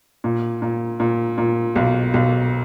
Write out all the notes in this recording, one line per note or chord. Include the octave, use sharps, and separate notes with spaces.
A#2
A#2
A#2
A#2
B1
B1